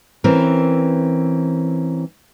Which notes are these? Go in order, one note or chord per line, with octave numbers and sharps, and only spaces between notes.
E3 C4 C#4 A#4